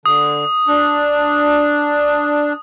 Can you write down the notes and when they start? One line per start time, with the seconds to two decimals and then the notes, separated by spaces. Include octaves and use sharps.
0.06 D3 D#6
0.68 D4